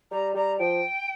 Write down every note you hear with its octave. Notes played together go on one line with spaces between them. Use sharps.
G3 A#5
G3 A#5
F3 G5